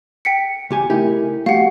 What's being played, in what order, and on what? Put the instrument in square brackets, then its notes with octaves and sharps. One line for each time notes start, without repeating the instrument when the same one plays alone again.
[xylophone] G5 B6 C#7
[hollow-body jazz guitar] C#2 G4 G#5
[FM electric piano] C#3 A3 E4 [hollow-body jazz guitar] D#4 G4 A#4
[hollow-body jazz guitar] A3 [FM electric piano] F#4 G4 [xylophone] F5 F#5